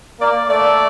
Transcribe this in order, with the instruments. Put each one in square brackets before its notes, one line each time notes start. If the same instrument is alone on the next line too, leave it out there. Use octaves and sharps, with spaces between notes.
[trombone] A#3 [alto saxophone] D5
[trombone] A3 [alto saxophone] D5